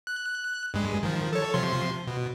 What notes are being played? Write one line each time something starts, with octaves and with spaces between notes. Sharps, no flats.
F#6
G2 G#3
D#3 F3
A4 C#5
C3 F3 C6
B2